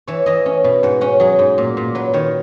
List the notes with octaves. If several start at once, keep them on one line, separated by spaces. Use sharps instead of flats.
E3 C#5
E3 D#5
C#4
B2
G#2 F#5
C#4 F#5
F#3 G#4
G#2
A#2
A#2
F#3 B4
D#3 C#5